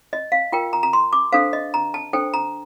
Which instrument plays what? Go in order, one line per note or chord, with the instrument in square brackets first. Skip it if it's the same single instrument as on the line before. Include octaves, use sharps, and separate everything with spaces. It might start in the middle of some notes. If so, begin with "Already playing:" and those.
[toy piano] D#5
F5
F4 A#4 G5
A#5
A#5
C6
D6
D4 A4 C5 F5
D#5
A#5
A5
D4 A4 C5 G5
A#5